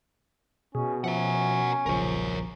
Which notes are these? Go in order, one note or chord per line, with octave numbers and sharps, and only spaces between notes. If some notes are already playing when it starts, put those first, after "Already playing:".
B2 C#4 G#4
F3 C#4 A#4 E5 F#5
D#1 B1 C#3 F3 A#4 C#5